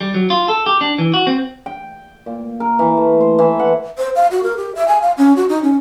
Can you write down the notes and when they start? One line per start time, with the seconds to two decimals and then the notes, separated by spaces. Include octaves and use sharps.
0.01 G3
0.14 F#3
0.30 F4
0.48 A4
0.66 G4
0.81 D4
0.98 E3
1.14 F#4
1.27 C4
1.66 G5
2.26 A#2
2.60 A#4
2.79 E3
2.97 A3
3.21 C5
3.39 E3
3.60 F#5
3.98 C5
4.15 F5
4.31 F#4
4.43 A#4
4.57 G4
4.75 E5
4.88 G#5
5.02 F5
5.17 C#4
5.36 F#4
5.49 D#4
5.63 C#4